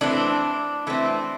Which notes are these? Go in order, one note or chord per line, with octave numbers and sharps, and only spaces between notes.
E3 A3 C4 D4
E3 A3 C4